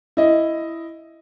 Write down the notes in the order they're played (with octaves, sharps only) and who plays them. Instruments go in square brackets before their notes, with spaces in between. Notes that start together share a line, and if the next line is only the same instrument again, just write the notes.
[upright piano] E4 D#5